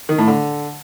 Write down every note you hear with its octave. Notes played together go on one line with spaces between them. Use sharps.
D#3
A2
D3